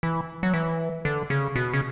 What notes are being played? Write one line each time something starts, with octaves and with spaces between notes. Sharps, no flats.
E3
F#3
E3
D3
C#3
B2
C#3